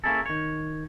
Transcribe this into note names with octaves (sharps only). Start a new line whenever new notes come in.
A#3 C#4 D4 E4 G#4 A4
D#3 C#5